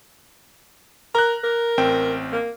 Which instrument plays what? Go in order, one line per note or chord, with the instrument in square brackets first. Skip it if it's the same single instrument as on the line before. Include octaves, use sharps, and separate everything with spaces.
[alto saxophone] A#4 [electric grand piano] A#5 F#6
[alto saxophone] A#4
[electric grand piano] A1 C4 G5
[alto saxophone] A#3